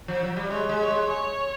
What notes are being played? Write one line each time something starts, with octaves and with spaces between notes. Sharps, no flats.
F3
F#3
G3
G#3 C#5
G#3
C#5
G#3
C#5